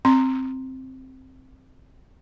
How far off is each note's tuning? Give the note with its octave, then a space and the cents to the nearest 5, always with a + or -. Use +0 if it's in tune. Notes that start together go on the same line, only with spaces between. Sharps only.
C4 +0 C6 +0